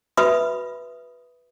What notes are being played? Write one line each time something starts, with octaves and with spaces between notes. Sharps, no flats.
F#4 B4 E5 B5 D#6